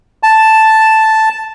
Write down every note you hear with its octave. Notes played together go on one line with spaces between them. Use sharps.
A5